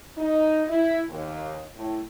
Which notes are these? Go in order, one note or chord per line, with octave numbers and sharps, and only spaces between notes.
D#4
E4
D#2
A2